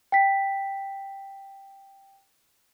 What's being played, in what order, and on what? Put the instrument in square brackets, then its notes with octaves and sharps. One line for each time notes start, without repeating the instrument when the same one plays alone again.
[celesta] G5 B6